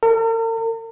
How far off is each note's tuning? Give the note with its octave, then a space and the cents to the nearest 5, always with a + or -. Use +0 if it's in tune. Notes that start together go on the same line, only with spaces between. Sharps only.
A#4 -45